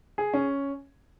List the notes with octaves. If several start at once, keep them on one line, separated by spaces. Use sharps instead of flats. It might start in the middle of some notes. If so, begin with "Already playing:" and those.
G#4
C#4